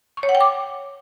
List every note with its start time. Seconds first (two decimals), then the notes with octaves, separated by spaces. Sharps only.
0.17 C#6
0.23 C#5
0.29 F#5
0.35 G5
0.41 D6